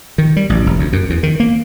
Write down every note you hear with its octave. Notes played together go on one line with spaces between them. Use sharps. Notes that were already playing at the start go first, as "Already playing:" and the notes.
D#3
G3
A1
F1
D2
F#2
E2
D#3
A#3